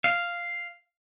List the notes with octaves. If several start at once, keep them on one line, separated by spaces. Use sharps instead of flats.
F5